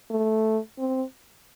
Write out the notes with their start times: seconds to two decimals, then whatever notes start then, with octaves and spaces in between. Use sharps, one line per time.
0.10 A3
0.79 C4